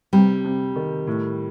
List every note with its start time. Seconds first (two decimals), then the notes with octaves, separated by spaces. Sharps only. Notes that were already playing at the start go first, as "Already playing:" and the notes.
0.13 C3 G3
0.45 C3
0.76 D#3
1.07 A2